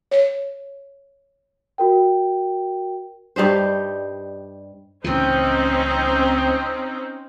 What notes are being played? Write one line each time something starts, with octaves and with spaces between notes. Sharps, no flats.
C#5
F#4 A#4 G5
G2 G3 D#4 C5
C#2 A2 E3 C4 C#4 D#4